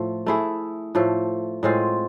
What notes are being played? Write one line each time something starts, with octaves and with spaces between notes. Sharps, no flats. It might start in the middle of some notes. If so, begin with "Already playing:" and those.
Already playing: A2 F3 A3
A3 E4 G#4
A2 F3 A3
A2 G#3 C4 F4